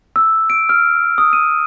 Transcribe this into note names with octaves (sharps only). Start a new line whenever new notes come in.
E6
D7
F6
D#6
D#7